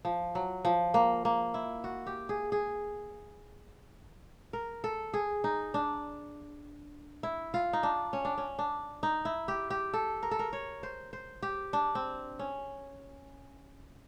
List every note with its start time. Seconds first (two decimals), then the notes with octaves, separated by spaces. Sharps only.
0.05 F3
0.35 F#3
0.65 F3
0.94 A#3
1.25 A#3
1.54 E4
1.84 F#4
2.07 G4
2.29 G#4
2.52 G#4
4.53 A#4
4.84 A4
5.14 G#4
5.44 D#4
5.74 D4
7.23 E4
7.54 F4
7.73 D#4
7.83 D4
8.13 C#4
8.25 D4
8.38 C#4
8.59 D4
9.03 D#4
9.25 E4
9.48 G4
9.70 G4
9.94 A4
10.23 A#4
10.31 A4
10.39 A#4
10.53 C#5
10.83 C5
11.13 C5
11.43 G4
11.73 D4
11.95 C4
12.39 C#4